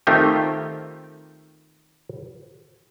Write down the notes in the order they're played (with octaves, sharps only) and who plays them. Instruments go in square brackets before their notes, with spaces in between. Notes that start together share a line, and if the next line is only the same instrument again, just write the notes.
[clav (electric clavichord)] D#3 A3 C4 D#4 F4 G4